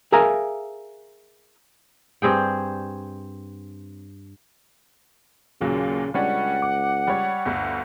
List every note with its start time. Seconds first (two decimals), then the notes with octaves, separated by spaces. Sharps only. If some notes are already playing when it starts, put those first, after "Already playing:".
0.12 G#4 A#4 E5 F5 G#5 A#5
2.22 G2 C4 G#4 G5
5.61 D#2 A#2 C#3 F#3
6.14 C#2 G3 C#4 D4 F#5
6.62 D6
7.08 G3 C#5
7.45 G1 D2